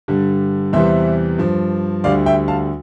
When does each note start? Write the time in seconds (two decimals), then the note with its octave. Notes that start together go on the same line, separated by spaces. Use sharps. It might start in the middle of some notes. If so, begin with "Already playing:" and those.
0.08 G2 D3 G3
0.73 E2 C3 E3 G3 C5 E5
1.38 G2 F3
2.04 D2 D3 G3 D5 F5
2.26 E5 G5
2.48 F5 A5